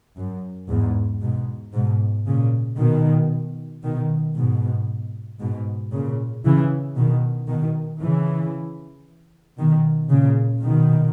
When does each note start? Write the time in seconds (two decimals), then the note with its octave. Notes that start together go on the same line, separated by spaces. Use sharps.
0.17 F#2
0.69 E2 G#2
1.21 G#2 B2
1.73 G#2 B2
2.26 A#2 C#3
2.78 B2 D#3
3.83 B2 D#3
4.35 G#2 B2
5.39 G#2 B2
5.92 A#2 C#3
6.44 C#3 E3
6.96 B2 D#3
7.48 B2 D#3
8.01 C#3 E3
9.57 B2 D#3
10.10 A#2 C#3
10.62 B2 D#3